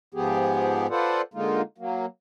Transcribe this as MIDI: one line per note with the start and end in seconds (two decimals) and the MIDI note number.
0.14 0.87 44
0.14 0.87 53
0.14 0.87 59
0.14 0.87 67
0.14 0.87 68
0.90 1.22 65
0.90 1.22 69
0.90 1.22 71
0.90 1.22 72
0.90 1.22 74
0.90 1.22 78
1.34 1.62 50
1.34 1.62 56
1.34 1.62 58
1.34 1.62 63
1.34 1.62 65
1.78 2.06 54
1.78 2.06 58